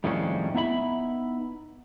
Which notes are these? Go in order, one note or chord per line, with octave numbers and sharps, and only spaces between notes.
F2 A2 D#3 G3 G#3 C#4
B3 D#4 E4 E5 B5